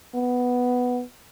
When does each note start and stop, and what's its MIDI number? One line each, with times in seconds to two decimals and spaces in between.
0.14 1.03 59